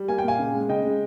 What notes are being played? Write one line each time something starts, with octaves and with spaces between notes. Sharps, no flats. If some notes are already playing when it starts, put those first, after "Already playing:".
Already playing: G3
A#3 G#5
G5
A#2 F5 G#5
C#3
G#3
C#3 D#5 G5
G#3